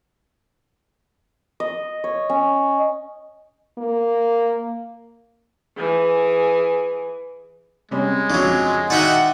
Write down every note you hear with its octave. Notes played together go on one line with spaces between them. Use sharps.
D#5
C#5
C#4
A#3
E3 G#4
C3 G3 G#3 C#4
F2 C#3 F#3 D4
D#3 D#4 F#4 D5 E5 F#5 G5